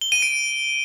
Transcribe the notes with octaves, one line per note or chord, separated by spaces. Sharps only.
G7
D#7
D7